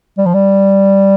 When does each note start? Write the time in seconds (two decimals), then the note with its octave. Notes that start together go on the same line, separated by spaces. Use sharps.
0.18 G3
0.26 F3
0.34 G3